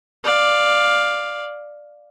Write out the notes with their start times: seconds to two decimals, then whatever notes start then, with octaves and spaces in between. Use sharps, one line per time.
0.24 D5 F5